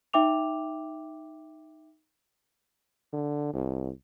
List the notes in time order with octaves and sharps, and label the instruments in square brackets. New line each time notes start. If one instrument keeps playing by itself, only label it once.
[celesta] D#4 E5 G5 D6 F7
[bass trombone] D3
C2